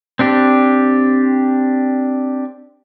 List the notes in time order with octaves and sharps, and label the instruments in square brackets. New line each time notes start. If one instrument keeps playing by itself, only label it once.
[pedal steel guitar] C4 D4 G4